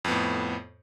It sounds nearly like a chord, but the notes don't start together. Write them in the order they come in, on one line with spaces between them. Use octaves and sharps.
F2 B3 A2